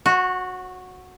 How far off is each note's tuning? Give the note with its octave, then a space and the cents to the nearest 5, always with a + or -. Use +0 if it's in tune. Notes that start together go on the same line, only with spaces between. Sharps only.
F#4 -10 C#5 -35